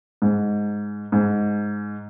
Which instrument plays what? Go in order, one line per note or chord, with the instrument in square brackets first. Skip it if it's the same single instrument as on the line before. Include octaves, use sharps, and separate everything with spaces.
[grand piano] G#2
G#2